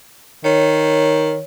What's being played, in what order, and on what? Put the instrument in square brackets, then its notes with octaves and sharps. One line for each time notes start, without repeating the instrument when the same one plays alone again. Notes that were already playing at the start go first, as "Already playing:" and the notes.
[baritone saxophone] D#3 [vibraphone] C#5